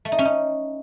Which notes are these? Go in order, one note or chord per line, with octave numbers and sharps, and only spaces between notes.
A3
D#4
C#4
D#4